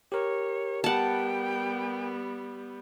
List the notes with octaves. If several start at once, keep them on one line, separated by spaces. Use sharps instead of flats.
G4 A#4 C#5
G3 B3 F#5 G5 A5